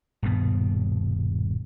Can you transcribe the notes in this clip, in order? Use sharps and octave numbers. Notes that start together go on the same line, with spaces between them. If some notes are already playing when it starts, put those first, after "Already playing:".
D#1 G2 B2 B3